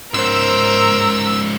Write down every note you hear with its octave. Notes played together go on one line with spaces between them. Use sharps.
C#2 G#2 A#4 C5 E6